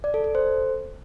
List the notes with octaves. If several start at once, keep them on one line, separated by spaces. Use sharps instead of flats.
D5
A4
A4
C5